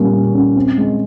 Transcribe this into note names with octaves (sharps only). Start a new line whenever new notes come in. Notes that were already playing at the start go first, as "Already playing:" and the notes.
Already playing: A#2 G3 A#3 C#4
A#2
C#4
C4
G#3